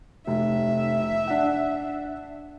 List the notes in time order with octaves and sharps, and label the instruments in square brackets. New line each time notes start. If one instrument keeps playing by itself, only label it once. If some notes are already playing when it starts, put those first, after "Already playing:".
[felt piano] F1 [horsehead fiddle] E5
[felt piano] D4 F#5